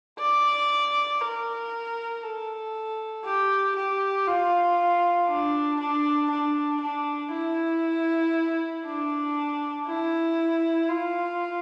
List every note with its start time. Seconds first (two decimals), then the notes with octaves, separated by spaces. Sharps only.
0.19 D5
1.21 A#4
2.23 A4
3.25 G4
3.76 G4
4.27 F4
5.28 D4
5.80 D4
6.31 D4
6.82 D4
7.33 E4
8.86 D4
9.87 E4
10.90 F4